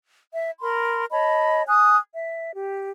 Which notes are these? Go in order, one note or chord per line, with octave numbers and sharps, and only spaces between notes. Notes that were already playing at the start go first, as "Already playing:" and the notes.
E5
A#4 B5 C6
C#5 D#5 A5 B5
G#5 D#6 F#6
E5
G4